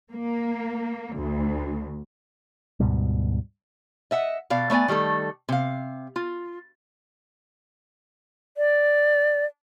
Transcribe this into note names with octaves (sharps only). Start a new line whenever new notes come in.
A#3
D2
D2 G#2 B2 G3
D#5 E5 F#5
B2 D5 F5
A3 B3 D5 G#5
D#3 G3 A3 A4
C3 F5
F4
D5